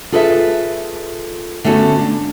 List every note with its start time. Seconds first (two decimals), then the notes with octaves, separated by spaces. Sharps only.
0.12 F4 G#4 A4 B4 D5 E5
1.64 D3 A3 B3 C#4 F#4 A4
1.99 D4